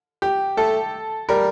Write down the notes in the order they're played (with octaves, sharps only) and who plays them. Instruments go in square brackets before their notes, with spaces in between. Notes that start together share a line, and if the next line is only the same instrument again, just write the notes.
[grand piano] G4
[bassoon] A3 [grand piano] A4
[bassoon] G3 [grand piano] A#4